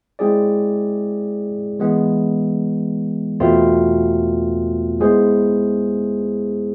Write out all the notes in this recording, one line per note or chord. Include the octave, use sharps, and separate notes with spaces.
G#3 C4 E4 G#4 D5
E3 G#3 B3
E2 B2 A3 C4 F4
G#3 B3 E4 G#4 C5